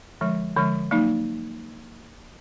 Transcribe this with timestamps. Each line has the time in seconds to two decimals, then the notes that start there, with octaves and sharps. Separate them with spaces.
0.21 D3 F3 G#3
0.56 D3 F3 G#3
0.91 F#3 A#3 D#4